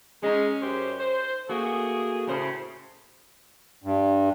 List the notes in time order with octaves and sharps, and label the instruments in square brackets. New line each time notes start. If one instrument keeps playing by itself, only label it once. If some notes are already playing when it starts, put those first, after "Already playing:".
[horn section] G#3 [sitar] C#4 D#4
[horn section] F#2 G4 C5
C5
[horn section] A3 A#3 G#4 [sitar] F#4
[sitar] A2 C#3 C5
[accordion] G2